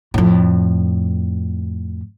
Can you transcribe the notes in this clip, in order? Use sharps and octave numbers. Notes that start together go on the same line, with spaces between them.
F2 A2